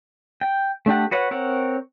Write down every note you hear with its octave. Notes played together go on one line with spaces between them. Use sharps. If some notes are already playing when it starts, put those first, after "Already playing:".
G5
A3 D4 G4 F#5
F#4 B4 C#5 F#5
C4 A#4 C#5 F#5